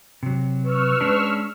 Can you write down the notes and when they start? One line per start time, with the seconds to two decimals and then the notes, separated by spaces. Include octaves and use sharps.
0.23 C3 F#3
0.65 B4 C#6 E6 F6
1.01 G#3 C#4 D4